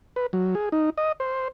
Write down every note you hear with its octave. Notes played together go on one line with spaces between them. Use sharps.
B4
F#3
G#4
D#4
D#5
C5